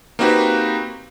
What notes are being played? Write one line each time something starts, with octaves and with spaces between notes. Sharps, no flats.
A#3 C4 D#4 F#4 G4 B4